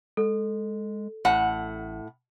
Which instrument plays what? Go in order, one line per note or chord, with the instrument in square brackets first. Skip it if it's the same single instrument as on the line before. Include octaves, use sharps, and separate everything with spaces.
[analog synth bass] G#3 [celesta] A4
[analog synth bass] A1 [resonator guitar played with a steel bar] A2 F#5